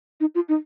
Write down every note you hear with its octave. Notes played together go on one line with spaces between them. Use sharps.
D#4
F4
D#4